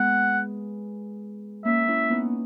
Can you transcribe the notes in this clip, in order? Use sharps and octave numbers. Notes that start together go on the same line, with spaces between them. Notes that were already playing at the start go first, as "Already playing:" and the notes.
Already playing: G#3 B3 F#5
A#3 C#4 E5
C#4 E4
B3 D#4